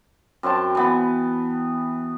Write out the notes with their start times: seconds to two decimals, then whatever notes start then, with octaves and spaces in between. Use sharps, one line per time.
0.43 F#2 C4 G5 A5
0.75 E3 B3